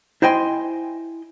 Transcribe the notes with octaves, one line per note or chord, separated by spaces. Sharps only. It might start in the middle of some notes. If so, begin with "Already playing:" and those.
E4 C5 D#5 G5 G#5 C6